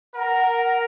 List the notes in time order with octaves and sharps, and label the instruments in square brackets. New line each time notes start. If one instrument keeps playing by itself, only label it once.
[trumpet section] A#4 [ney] F#5